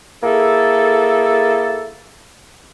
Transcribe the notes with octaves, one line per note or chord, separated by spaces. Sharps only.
A#3 E4 G#4 A4